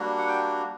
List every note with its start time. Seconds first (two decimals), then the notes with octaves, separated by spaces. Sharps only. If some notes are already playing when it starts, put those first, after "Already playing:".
Already playing: G3 A#3 D4 F#4
0.18 F#5
0.27 G5